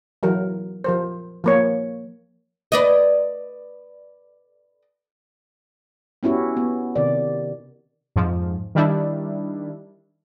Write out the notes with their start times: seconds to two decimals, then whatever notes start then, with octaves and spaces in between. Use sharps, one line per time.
0.23 E3 F#3 A#4
0.84 F3 A#4 C5
1.44 F3 A#3 C#5
2.72 B4 D5 D#5
6.23 B3 C#4 E4 F#4 G4
6.57 B3
6.96 C3 D#3 D5
8.16 F2 G#2 F3
8.75 D#3 G3 D4 E4